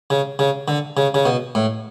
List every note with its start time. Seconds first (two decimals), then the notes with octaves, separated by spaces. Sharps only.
0.10 C#3
0.39 C#3
0.68 D3
0.97 C#3
1.14 C#3
1.26 B2
1.55 A2